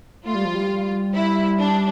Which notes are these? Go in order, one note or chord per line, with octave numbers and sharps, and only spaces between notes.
A3 F4
G3
F3
G3
E4
D4